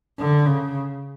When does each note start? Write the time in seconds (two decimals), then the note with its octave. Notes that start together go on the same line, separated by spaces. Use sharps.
0.18 D3
0.46 C#3